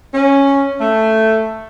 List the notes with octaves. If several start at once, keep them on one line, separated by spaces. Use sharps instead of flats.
C#4
A3